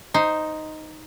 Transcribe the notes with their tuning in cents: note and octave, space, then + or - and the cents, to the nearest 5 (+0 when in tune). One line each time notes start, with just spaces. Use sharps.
D#4 +0 C5 +0